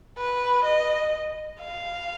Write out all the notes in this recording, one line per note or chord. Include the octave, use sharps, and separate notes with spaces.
B4
D#5
F5